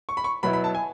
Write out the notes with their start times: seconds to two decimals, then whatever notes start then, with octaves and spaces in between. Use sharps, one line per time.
0.09 C#6
0.17 B5
0.24 C#6
0.43 B2 F#3 B3 E4 B5
0.53 B5
0.64 A5
0.75 G#5